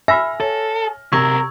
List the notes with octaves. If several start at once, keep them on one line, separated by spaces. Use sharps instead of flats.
E5 G#5 B5 F6 A#6
A4 C#5
B1 C3 A#4 C#6 E6 G#6